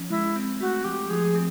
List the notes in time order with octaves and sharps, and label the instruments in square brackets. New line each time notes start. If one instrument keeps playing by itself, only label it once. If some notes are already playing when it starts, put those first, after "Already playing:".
Already playing: [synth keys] F3 C#4
[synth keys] G#3 [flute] E4
[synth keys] C4
[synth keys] A3 [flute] F#4
[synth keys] F3 [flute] G4
[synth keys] F3 [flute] G#4
[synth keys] C4